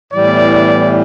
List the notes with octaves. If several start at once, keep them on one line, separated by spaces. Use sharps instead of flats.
A2 E3 G3 B3 D5